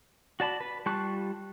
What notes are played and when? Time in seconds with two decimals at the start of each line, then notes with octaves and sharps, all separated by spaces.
0.40 F#4 D5 A5 B5
0.60 B4
0.86 G3 F4 A5 C#6 F#6